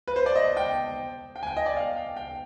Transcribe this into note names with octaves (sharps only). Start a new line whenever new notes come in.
B4
C5
D5
D#5
G5
G5
G#5
G5
D#5
D5
F5
G5
G5